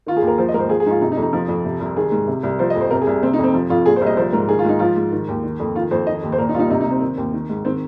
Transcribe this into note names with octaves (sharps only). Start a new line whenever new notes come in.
D#3 F4
G#4
D#2
A#4
F3 C5
D#5
G#2 A#4
C5
F3 G#4
G#4
G#2 D#4 F4
C3 D#4
D#4
F2
D#4
F3 D#4
F2
C3
C2
D#3 G#4
G#2
C3
C2
F3 C5
D#5
F2
C5
C3 A#4
G#4
C2
C3 C4
D#4
F2
C4
F3
F2 F4
A#2 G#4
C5
C2 D#5
F3 C5
G#2 A#4
D#3 G#4
F4
G#2 D#4
F3 F4
G#2
D#3
D#2
D#3
F2
D#3 F4
F2 C5
D#3 D#5
D#2
C5
A#2 A#4
D#4
C2 F4
D#4
C3 D#4
D#4
C2
C4
D#3
D#2
D#3
G#2
D#3 C4